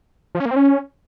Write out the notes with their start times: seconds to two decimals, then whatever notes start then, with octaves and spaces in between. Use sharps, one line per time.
0.35 F3
0.40 C#4
0.45 A#3
0.51 C4
0.56 C#4